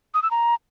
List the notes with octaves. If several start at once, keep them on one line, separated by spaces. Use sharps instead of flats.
D#6
E6
A#5